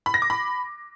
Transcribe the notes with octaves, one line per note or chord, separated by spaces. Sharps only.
B5
A#6
D6
B5